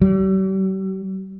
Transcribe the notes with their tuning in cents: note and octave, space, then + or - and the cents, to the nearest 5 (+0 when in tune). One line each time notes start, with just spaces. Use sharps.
G3 -45